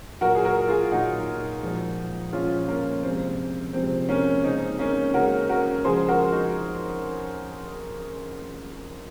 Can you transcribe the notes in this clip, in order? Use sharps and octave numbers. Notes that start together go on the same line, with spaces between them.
A#2 F#3 F#4 A#4
G#4
F#4 A#4
F4 G#4
A#2 F#3 D#4 F#4
A#2 F3 G#3
A#2 F3 G#3 C#4 F4
A#3 C#4
C3 F3 G#3 C4
C3 F3 G#3 C4
A#3 C#4
C#3 G#3 C4 D#4
A#3 C#4
C#3 G#3 F#4 A#4
F#4 A#4
C#3 F3 G#3 G#4 C5
F#4 A#4
D#4 F#4